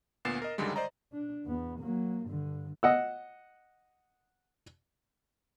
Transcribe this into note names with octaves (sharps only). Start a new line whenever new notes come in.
D2 A#2 B3 A6 C7 E7
A#4 D#5
C#2 F#2 D3 D#3 G3 G#3
C5 D5 D#5 A#5
D4
E2 B3
F#3 A#3
G2 D3
D#5 F#5 E6